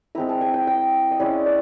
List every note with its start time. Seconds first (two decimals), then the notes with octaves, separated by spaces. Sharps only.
0.15 G#3 C4 E4 A#5
0.29 A5
0.41 G#5
0.54 G5
0.67 G5
1.11 D#5
1.20 G#3 C#4 E4 D5
1.46 D5